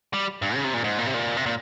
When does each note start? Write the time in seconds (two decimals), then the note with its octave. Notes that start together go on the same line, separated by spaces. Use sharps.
0.13 G3
0.42 G2
0.55 C#3
0.64 C3
0.74 A#2
0.84 G#2
0.98 A#2
1.06 C3
1.14 A#2
1.37 C3
1.46 A#2